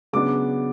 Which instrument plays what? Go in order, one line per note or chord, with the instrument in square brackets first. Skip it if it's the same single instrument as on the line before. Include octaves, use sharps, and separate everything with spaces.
[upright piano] C#3 F#3 B3 D4 D6